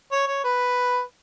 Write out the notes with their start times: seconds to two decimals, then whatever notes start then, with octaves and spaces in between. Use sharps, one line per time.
0.12 C#5
0.28 C#5
0.44 B4